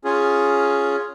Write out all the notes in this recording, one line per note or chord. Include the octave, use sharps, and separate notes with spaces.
C#4 F4 G#4